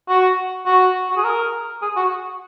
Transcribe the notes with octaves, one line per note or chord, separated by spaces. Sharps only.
F#4
F#4
F#4
G#4
A#4
G#4
F#4